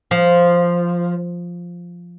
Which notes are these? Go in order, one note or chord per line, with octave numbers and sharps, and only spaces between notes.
F3